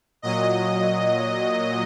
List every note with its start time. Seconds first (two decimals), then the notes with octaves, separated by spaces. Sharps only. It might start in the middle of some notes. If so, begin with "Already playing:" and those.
0.22 A#2 F#3 D#5